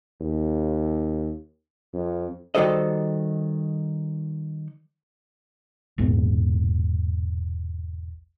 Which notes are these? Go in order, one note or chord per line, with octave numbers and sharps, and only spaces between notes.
D#2
F2
D#3 G3 F#4 A4 C5 D#5
E1 A#1 G#2 B3